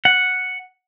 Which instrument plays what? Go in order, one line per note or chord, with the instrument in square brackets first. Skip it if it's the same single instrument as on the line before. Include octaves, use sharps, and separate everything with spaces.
[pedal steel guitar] F#5